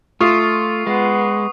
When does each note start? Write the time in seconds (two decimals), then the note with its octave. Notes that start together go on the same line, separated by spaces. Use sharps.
0.21 A3 F4 C#6 D#6 C7
0.87 G#3 B3